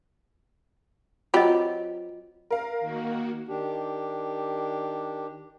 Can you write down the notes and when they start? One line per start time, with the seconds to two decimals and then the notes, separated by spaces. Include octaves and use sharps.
1.34 F#3 C4 F4 G4 D#5
2.51 A#4 F5
2.80 D#3 A#3 F#4
3.48 D#3 D4 G4